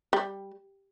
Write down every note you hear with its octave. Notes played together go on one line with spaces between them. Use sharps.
G3